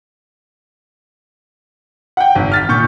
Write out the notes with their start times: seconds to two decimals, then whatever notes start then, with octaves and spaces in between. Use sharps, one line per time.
2.17 F#5 G5
2.35 G#1
2.52 F6 A6 B6
2.69 A#2 C#6 G6